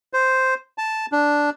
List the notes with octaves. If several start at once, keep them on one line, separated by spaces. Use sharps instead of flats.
C5
A5
D4